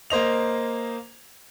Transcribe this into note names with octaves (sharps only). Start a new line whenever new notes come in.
A#3 C5 D#5 F7